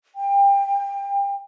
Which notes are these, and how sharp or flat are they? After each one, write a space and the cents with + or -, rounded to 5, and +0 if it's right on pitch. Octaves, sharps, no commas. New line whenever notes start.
G5 +30